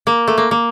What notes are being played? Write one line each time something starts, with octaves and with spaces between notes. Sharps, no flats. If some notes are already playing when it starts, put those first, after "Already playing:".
A#3
A3
A#3
A#3